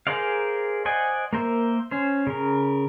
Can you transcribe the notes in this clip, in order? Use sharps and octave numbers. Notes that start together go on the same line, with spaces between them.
G#4 A#4 C5 D5 F5
C5 D5 D#5 F#5 G#5
A#3 A#4 C5 E5
C#4 C5
C#3 A#4